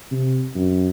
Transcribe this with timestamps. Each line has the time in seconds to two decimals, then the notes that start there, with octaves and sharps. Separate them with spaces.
0.11 C3
0.55 F#2